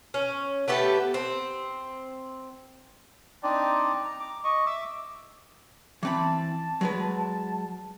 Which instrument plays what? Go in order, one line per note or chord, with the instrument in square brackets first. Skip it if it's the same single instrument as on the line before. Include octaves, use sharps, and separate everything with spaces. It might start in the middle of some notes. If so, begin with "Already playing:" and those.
[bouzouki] C#4
A3 B3 G4 A4
C4
[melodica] C4 D4 D#4 D5
A#5
D6
D#5 C#6
E5 D6 E6
[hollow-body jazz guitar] E3 C4 B5 [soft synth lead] A5
[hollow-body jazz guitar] F#3 G#3 B4